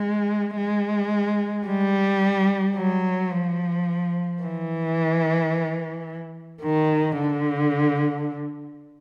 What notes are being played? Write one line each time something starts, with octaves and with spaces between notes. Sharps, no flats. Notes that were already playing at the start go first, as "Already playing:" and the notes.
Already playing: G#3
G#3
G3
F#3
F3
E3
D#3
D3